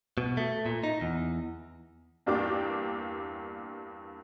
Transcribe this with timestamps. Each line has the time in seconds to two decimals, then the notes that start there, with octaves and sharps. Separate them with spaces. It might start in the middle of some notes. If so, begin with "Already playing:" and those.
0.18 B2
0.37 A3
0.66 A#2
0.84 D#4
1.01 E2
2.26 E2 G2 A#3 D4 G4 D6